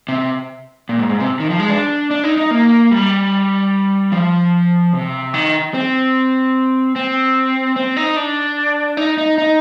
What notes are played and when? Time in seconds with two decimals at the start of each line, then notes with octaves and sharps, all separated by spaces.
0.09 C3
0.89 A#2
0.99 G#2
1.09 G#2
1.19 C3
1.40 D#3
1.50 F3
1.59 G#3
1.69 D4
2.11 D4
2.24 D#4
2.38 D#4
2.51 A#3
2.91 G3
4.12 F3
4.93 C3
5.34 D#3
5.74 C4
6.96 C4
7.76 C4
7.97 D#4
8.16 D4
8.97 D#4
9.18 D#4
9.38 D#4